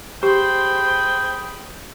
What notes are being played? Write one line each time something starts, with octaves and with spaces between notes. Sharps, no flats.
G4 G#4 C5 G5 B5